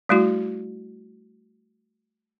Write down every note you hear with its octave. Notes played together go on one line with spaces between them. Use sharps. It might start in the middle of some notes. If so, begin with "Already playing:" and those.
G3 A3 E4 F#4